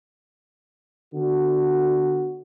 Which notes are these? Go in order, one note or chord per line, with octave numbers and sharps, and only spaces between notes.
D3 B3 F#4